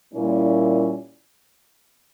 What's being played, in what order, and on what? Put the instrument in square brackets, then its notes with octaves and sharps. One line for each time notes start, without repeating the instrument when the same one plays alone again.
[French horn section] A#2 G3 A#3 C#4 E4